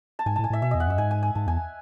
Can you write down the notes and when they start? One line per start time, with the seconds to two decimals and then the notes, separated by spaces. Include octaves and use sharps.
0.19 A5
0.26 G#2 G#5
0.36 A2 A5
0.44 G#5
0.50 A2 E5
0.62 B2 E5
0.71 E2 D#5
0.80 F#5
0.87 F#2 E5
0.98 G#2 G#5
1.11 G#5
1.23 G#5
1.35 G#2 A5
1.47 E2 G#5